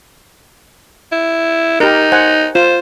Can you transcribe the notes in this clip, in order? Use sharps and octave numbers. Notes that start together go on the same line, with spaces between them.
E4
D#4 G4 A#4
C5 F#5 G#5
F4 C5